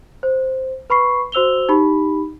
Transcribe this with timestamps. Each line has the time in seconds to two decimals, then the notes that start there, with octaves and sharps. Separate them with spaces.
0.23 C5
0.90 B4 B5 C#6 C7
1.32 F#4 C5 E6 F7 G7
1.69 D#4 G4 B5